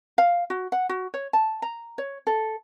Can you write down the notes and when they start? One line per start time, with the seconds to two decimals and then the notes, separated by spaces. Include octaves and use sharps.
0.18 F5
0.50 F#4
0.72 F#5
0.89 F#4
1.14 C#5
1.33 A5
1.62 A#5
1.98 C#5
2.27 A4